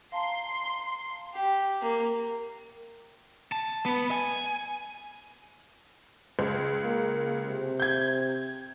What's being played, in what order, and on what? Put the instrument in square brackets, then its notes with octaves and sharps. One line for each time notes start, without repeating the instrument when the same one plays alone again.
[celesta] F5 A5 A#5 [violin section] C6
[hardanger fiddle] G4
A#3
[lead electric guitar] A5
B3
G#5
[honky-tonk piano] C#2
[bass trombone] A#3
C3
[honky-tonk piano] G6 G#6